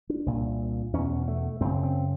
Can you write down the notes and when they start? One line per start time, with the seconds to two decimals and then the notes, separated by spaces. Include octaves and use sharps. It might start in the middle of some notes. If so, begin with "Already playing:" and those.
0.10 D4
0.26 C2 A#2
0.93 E2 B2 C#4
1.28 A3
1.61 F#2 C#3 C4
1.83 C4